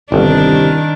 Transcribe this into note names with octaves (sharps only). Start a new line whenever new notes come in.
G1 C2 D#3 D4